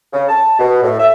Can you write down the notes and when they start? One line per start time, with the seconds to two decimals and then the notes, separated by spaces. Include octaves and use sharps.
0.13 C#3
0.29 A5
0.59 B2
0.83 A2
0.99 E5